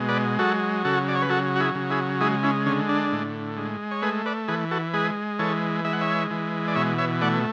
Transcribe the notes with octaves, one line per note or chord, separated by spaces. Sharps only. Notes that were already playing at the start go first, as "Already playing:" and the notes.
Already playing: B2 G#3
B4 D5
F#3 F#4 A4
C#3 F#4 A4
D5
C#5
B4
F#3 F#4 A4
F#4
E4 G#4
C#3
E4 G#4
G#3 E4 G#4
C#4 E4
D3 C#4
D4
A2
G#3
C#5
A3 G#4 B4
B4 D5
E3 G#4 B4
F#4 A4
G#3 G#4 B4
E3 A4 C#5
G#3 E5
F#5
C#5 E5
E3
D5
B2 C#5 E5
C#5 E5
A3 D5 F#5